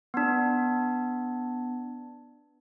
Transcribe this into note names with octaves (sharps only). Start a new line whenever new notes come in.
B3 D4